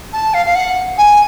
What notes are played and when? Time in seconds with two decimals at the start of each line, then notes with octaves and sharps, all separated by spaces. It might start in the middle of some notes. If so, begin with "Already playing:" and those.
0.13 A5
0.34 F5
0.46 F5
0.55 F#5
0.98 G#5